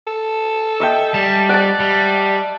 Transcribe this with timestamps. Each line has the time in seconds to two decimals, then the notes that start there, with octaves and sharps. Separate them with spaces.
0.07 A4
0.80 D#5 E5 G5
1.14 G3 A5
1.49 D5 F#5 A5
1.80 G3